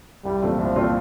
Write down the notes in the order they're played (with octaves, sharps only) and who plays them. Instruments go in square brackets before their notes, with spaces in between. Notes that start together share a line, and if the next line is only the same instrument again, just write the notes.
[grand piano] C2 [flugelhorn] G3
[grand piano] A#2 A3 C4 F4
[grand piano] C2 [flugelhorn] F3
[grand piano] A#2 A3 C4 F4